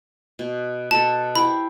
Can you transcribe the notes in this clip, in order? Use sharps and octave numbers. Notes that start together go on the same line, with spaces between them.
B2
B2 A4 A5
E4 G4 C5 B5